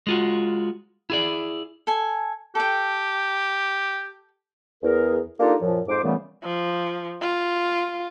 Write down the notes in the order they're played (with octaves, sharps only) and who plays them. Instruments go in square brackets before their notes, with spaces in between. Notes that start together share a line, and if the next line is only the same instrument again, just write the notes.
[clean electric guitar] G#3 F4 F#4
E4 G#4 D5
[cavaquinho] A4 G#5
[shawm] G4 [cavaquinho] A4 G5
[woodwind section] E2 G#4 A#4
A#3 D4 D#4 F4 G4 A4
F#2 A#2 F3
F2 G#2 C5 D6
A#2 C#3 E3 G3 A3 B3
[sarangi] F3
F4